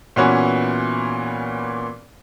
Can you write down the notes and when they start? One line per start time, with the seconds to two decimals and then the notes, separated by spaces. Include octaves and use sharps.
0.16 A#2 E3 B3 C#4 F#4